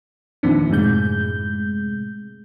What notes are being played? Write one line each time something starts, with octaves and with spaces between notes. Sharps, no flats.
F2 A#2 D#3 F3 C4 D4
F#2 A2 C3 G#3 G6